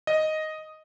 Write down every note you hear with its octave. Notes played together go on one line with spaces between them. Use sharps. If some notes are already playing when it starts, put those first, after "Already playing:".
D#5